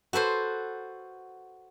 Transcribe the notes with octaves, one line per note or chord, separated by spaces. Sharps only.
F#4 A4 B4 C5